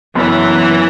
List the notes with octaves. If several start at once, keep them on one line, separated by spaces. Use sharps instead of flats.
F#1 F#2 E3 F#3 B3